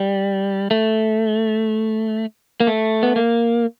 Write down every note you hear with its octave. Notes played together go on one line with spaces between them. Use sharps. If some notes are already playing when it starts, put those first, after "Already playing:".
Already playing: G3
A3
A#3
A3
B3
A#3